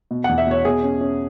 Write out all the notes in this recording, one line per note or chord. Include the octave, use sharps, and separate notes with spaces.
B2
F#5
E2
E5
B2 C#5
B2 G#4
C#4
C#4